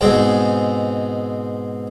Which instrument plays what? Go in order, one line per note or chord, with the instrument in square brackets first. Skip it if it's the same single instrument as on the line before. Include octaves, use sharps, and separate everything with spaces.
[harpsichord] G#2 B2 G#3 C4